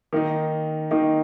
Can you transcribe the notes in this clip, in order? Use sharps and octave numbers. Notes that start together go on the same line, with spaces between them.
D#3 A#3 D#4
D#3 A#3 D#4